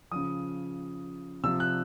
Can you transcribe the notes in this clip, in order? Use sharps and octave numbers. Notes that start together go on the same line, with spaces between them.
C#3 F3 D#6
C3 F3 E6
F#6